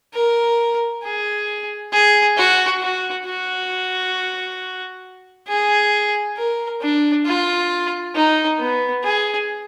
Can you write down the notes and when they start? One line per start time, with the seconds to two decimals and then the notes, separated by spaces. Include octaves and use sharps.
0.14 A#4
1.03 G#4
1.92 G#4
2.37 F#4
2.81 F#4
3.26 F#4
5.48 G#4
6.37 A#4
6.82 D4
7.26 F4
8.15 D#4
8.59 B3
9.04 G#4